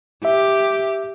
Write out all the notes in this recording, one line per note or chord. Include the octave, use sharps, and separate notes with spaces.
G4 E5